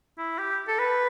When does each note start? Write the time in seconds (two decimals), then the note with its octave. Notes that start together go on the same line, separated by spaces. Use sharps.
0.18 E4
0.38 G4
0.68 A4
0.79 B4